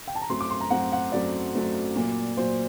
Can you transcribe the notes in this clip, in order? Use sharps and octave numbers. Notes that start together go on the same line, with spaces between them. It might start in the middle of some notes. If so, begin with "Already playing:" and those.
G5
A5
A#5
F#2 F#3 A3 C4 C6
D6
C6
A#5
F#2 F#3 A3 C4 F#5
F#5
F#2 F#3 A3 C4 D5
F#2 F#3 A3 C4
A#2 F#3 A#3
A#2 F#3 A#3 C5